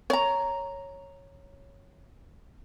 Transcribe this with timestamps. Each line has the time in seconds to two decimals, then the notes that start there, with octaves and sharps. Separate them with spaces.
0.10 C#5 A#5